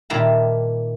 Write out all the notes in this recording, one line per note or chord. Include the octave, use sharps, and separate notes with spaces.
A#2 D#3 G3 E4 A5 A#5